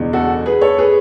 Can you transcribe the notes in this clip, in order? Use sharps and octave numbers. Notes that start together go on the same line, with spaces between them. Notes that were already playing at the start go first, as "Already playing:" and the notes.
Already playing: F#1 E2 B2 G#3 D4
F#4 A4
G#4 B4
A4 C#5
G#4 B4